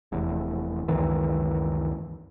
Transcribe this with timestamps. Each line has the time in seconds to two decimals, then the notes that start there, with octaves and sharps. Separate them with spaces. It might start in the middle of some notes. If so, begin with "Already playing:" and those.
0.12 F1 E2
0.88 C#2 F#2 D#3 E3